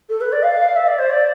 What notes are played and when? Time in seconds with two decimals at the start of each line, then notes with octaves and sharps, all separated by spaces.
0.09 A4
0.20 B4
0.32 D5
0.42 F5
0.75 E5
0.87 D5
0.98 C5
1.09 D5